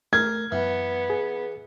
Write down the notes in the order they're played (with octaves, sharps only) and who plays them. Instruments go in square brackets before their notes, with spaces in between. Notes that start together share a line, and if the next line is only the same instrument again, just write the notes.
[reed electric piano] A3 [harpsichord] A#4 [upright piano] G#6
[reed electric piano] F#2 [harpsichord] E3 [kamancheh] B3
[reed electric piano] G#4